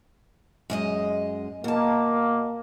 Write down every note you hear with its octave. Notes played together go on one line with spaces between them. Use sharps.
F#2 G#3 D#5
B2 A#3 A5